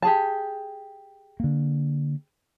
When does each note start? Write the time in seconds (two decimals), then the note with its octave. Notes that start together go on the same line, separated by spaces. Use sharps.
0.02 G4 G#4 A5
1.40 D3 A#3